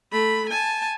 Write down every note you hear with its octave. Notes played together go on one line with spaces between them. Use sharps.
A3 B5
G#5 A5